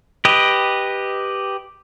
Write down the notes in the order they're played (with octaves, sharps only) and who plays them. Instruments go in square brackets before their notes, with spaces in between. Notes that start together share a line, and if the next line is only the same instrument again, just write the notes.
[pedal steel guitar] G4 B4 D#5